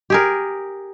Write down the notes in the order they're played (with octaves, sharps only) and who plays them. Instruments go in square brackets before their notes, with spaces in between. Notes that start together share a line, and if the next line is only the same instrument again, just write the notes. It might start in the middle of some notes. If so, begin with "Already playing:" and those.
[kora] G4 G#4 A#4